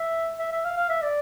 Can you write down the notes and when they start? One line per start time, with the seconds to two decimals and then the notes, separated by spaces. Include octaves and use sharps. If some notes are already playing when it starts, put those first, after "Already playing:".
Already playing: E5
0.39 E5
0.52 E5
0.64 F5
0.77 F5
0.89 E5
1.02 D5